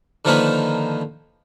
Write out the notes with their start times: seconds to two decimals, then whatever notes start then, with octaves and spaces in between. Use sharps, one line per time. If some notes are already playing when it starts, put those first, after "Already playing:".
0.25 D3 D#3 F3 A#3 D#4 B4